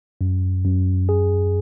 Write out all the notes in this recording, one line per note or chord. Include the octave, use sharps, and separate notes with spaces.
F#2
F#2
G#4